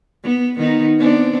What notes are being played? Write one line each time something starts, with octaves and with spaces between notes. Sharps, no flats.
B3
D#3 B3 D#4
B3 C4 D4